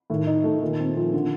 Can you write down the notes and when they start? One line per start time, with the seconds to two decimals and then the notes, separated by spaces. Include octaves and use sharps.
0.10 A2 D#3
0.27 D#4
0.44 A3
0.61 A#2 D#3
0.79 C4
0.97 F3
1.14 D3